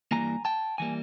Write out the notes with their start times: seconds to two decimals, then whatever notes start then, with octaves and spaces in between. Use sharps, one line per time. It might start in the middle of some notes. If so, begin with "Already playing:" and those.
0.11 G2 E3 G3 A#3 G#5 A#5
0.45 G5 A5
0.78 E3 G3 A#3 G#5